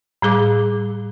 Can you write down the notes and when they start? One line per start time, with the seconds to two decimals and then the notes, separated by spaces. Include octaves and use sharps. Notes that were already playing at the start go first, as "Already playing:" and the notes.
0.22 A2 G3 G#4 D6